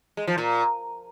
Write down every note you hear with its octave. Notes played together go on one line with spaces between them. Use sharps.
G#3
F3
A#2